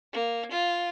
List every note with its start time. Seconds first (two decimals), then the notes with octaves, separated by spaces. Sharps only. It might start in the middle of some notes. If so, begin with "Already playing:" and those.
0.13 A#3
0.52 F4